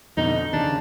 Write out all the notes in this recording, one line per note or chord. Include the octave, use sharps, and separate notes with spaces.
F2 B2 D3 D#4
D#2 C#3 D4